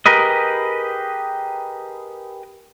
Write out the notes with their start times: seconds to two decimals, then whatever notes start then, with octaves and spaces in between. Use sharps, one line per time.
0.06 G4 G#4 A#4 B4 D#5